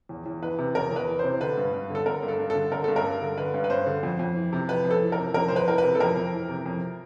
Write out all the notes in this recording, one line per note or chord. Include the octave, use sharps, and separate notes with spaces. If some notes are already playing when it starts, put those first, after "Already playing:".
E2
E2
E3 B4
C3
E2 A#4
E2 B4
E3
C3 C5
D3 B4
G2
G2
D3 A4
D3 A#4
G2
A4
G2
A4
D3
D3 A#4
G2 A4
A#4
G2
D3
D3 B4
G2
B4
G2 C5
D3
F2
F2
E3
C3
F2 B4
F2
A4
E3
A#4
C3
F2 A#4
F2 C5
B4
E3 A#4
B4
C3
A4
F2 A#4
F2
E3
C3
F2